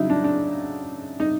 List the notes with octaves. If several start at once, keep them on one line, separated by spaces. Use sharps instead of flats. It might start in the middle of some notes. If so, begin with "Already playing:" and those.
Already playing: C#3 F#3 D#4 E4
D4
D4
D#4